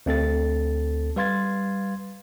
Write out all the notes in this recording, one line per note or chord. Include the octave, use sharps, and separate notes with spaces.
D2 C4 A4 A6
G3 B4 F5 C6 G#6 A6